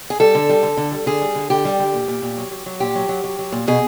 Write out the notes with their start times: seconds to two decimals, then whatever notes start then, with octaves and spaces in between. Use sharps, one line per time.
0.10 G#4
0.20 G3 A4
0.35 D3
0.49 G3
0.63 D3
0.77 D3
0.92 G3
1.06 D3 G#4
1.22 G3
1.35 D3
1.50 D3 G4
1.65 G3
1.79 D3
1.94 A#2
2.08 A#2
2.22 A#2
2.37 F#3
2.51 F#3
2.66 F#3
2.80 A#2 G4
2.95 F#3
3.09 F#3
3.24 F#3
3.39 F#3
3.52 A#2
3.67 B2 G#4